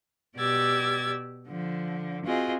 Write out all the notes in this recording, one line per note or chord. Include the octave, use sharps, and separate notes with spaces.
B2 G4 D5 E6 G#6 A6
D3 F3
C4 F4 F#4 G#4 D#5